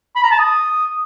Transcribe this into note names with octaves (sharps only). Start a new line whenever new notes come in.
B5
A#5
A5
D#6